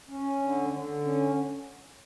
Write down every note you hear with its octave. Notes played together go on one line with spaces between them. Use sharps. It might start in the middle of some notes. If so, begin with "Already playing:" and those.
C#4
D3
D3
C#4